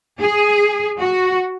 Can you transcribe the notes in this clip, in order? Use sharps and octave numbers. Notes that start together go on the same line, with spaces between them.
G#4
F#4